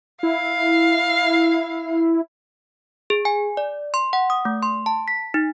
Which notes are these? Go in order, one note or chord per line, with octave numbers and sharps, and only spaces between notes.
E4 F5
G#4
G#5
D5
C6
F#5
D#6
A3
C6
A5
B6
D#4